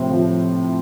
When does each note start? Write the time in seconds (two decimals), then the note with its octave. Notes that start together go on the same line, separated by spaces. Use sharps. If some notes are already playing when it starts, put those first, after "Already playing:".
Already playing: A2 C3 F3 C4
0.11 F3